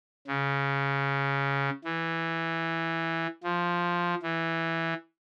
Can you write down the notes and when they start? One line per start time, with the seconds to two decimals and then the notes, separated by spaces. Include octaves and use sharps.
0.27 C#3
1.84 E3
3.43 F3
4.23 E3